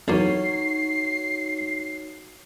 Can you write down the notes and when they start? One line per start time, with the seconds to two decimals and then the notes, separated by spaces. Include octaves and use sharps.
0.08 B1 E2 A#3 D#4 F#4 C#5 C7